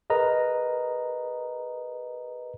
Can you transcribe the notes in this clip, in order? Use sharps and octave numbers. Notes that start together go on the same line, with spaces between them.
G#4 A#4 B4 D#5 A#5